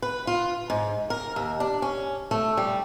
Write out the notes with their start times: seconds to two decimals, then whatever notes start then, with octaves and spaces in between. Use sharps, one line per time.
0.02 B4
0.27 F4
0.70 G#2
1.10 A#4
1.36 D#2
1.60 D4
1.82 C#4
2.31 A3
2.57 G3